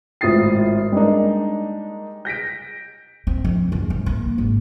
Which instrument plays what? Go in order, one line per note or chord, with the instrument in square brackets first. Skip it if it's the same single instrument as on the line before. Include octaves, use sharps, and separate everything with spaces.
[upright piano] G#1 A2 F4 D#6 A6 C7
G3 G#3 A#3 D4 D#4
G6 A#6 B6 D7
[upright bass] C4
F2
E2
C2
A#3
G#1